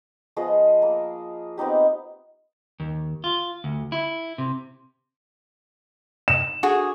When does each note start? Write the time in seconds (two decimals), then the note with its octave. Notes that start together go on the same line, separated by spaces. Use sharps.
0.37 F3 B3 G#4 D#5
0.82 A#3
1.58 B3 C4 D#4 G4
2.80 D#2
3.24 F4
3.64 D2
3.92 E4
4.38 C3
6.28 E7
6.63 D3 F#4 G#4